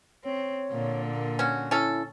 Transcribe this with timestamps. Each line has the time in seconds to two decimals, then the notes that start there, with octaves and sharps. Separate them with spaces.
0.24 C4 C#5
0.72 A#2 D3
1.06 A#3
1.39 C#4 F#4
1.71 C#4 E4 A4